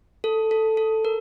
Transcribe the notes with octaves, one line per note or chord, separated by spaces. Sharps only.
A4
A4
A4
A#4